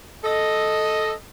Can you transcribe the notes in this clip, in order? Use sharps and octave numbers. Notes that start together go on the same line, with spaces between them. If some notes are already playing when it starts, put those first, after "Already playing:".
A4 D#5